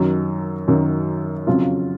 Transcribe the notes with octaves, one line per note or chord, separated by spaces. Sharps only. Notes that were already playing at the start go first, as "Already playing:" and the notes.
Already playing: F#2 D#3 F#3
F#2 D#3 F#3
F2 C#3 F#3 C#4 F4